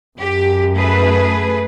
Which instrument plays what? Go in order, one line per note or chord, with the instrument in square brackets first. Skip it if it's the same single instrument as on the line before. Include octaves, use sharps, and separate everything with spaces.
[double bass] F#2 [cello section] G4
[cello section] A3 G#4 B4